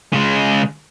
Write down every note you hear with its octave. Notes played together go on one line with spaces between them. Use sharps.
C#3 G#3